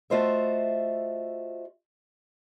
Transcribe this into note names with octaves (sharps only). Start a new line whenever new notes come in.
A3 F4 F#4 C5 D#5 E5